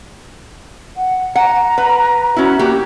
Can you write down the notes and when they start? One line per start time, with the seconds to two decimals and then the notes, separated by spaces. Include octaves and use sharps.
0.97 F#5
1.35 F#5 A#5
1.78 B4
2.36 C#4 E4 F#4
2.59 A#3 G4